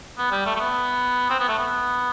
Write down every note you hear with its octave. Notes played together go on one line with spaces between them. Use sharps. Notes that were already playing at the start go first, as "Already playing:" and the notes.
B3
G3
A3
A3
B3
C4
B3
A3
B3